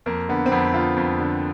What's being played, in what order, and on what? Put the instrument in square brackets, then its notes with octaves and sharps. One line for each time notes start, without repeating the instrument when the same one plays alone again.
[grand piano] F2 A#3
D3 B3
C4
F2 B3
D3 F4
F2
D3